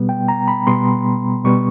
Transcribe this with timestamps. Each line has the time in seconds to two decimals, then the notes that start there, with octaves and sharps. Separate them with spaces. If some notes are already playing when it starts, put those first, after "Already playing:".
Already playing: B2 G3 B3
0.09 G5
0.28 A#5
0.48 B5
0.67 B2 G3 B3 C6
1.44 B2 G3 B3 C#6